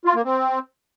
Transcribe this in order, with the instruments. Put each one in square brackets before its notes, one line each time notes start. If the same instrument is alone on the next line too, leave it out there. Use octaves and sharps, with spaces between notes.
[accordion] F4
A#3
C4